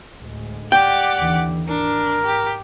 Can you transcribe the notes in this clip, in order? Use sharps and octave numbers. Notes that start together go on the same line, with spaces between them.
D2 A2 G#3
G4 D5 F#5 G5
D#2 D3 E3
G#1 D4 A#4
G4